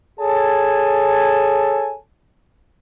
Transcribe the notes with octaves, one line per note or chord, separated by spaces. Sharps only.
G#4 A4 C#5 G#5 A5